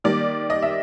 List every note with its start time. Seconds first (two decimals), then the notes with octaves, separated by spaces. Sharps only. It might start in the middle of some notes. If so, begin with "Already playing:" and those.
0.04 D#3 G3 A#3 D5
0.50 D#5
0.62 E5